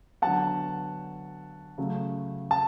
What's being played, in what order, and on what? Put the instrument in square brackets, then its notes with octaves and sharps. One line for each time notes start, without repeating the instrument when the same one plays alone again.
[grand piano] D3 F#3 B3 F#5 A5
C#3 F#3 A3
A5